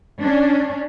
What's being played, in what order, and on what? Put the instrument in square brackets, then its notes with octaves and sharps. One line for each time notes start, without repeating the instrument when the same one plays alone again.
[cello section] C#4 D4